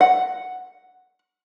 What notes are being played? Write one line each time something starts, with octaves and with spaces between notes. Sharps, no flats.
F#5